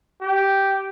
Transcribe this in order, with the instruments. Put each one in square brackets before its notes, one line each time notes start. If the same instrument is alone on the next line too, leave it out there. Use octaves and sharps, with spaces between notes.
[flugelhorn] G4